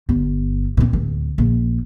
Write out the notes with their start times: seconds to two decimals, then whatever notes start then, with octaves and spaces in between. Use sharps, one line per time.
0.09 G1
0.77 A#2 C4
0.93 D1
1.38 A#1